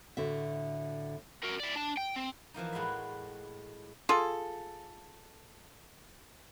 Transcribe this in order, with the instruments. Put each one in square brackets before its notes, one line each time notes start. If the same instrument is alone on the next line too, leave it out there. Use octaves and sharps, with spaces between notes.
[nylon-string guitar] A2 D3 F#4 E5
[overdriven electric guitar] F#4 A#4
E4 D5
D4 A5
G5
C4
[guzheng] E3 F3 A#3 D#4
A2 G#3 F#4 B4 E5
[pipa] F4 G#4 A4